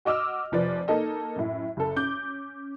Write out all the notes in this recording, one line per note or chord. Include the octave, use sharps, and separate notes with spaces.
F#4 D#5 D6 E6 F6
F1 F3 B4 D5
A#3 D#4 A4 D#5
F#2 A2
F#1 A4
C#4 D6 G6